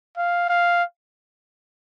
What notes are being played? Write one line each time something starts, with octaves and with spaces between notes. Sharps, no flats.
F5
F5